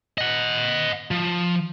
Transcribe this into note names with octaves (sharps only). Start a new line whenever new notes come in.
D#5 F#5
F3